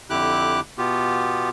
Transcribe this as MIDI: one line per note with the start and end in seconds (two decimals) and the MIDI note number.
0.10 0.60 41
0.10 0.60 50
0.10 0.60 64
0.10 0.60 67
0.10 0.60 86
0.10 0.60 90
0.78 1.50 47
0.78 1.50 59
0.78 1.50 65
0.78 1.50 67